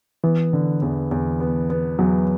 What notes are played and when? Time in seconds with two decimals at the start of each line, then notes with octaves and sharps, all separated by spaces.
0.24 E3 B3
0.53 D3
0.82 E2
1.11 E2
1.40 B3
1.70 B3
1.99 E2 F#3